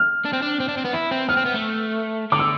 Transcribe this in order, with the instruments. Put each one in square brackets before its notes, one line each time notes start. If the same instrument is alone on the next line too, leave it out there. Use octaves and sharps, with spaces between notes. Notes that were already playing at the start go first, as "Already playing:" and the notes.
Already playing: [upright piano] F6
[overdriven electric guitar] D4
C4
D4
C4
D4
C4
B3
E4
C4
[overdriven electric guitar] B3 [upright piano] F6
[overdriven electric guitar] C4
B3
A3
[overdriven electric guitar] D3 [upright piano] D6
[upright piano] E6